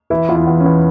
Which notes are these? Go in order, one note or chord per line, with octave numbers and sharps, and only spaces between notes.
E3 E4
E2 F4
E4
E2
C#4
E2